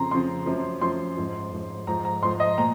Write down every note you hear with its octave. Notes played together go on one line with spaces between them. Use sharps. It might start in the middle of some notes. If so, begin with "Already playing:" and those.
Already playing: F2 C#3 F3 A#5 C6
F2 C#3 F3 C6
F#2 F3
F#2 F3 C6
G#2 F3
G#2 F3
G#2 F3 A#5
A#5
G#2 F3 C6
D#5
A#2 A#5